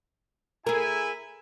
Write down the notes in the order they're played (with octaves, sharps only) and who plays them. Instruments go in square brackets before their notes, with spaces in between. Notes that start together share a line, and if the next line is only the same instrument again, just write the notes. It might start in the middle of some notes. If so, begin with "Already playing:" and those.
[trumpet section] E4 E5 G#5 [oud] G#4 A#4